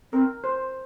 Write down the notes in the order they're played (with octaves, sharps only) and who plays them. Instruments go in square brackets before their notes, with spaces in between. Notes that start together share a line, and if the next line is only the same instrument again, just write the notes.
[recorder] C4 [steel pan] A#4
[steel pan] C5